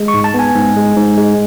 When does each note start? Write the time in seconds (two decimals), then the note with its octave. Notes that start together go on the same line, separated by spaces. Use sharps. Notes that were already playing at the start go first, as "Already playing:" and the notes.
Already playing: G#3
0.08 C#6
0.14 G#2
0.24 A5
0.34 B3
0.39 G#5
0.55 G#2
0.76 G#3
0.97 G#2
1.17 G#3